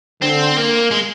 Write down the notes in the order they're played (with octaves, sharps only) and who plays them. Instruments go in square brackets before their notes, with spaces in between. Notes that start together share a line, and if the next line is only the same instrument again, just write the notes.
[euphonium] D3 [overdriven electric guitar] C4
[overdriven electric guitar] A#3
G#3